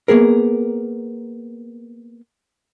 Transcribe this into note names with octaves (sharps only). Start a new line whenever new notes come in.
A#3 B3 G#4 A#4